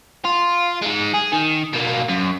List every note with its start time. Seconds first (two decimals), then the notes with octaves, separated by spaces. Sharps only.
0.25 F4
0.82 G#3 D#4
1.14 G#4
1.32 D#3
1.73 B2 A#3
2.08 F#2